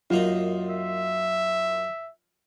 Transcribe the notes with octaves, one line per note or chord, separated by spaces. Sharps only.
F#2 A#3 D#4 F4
E5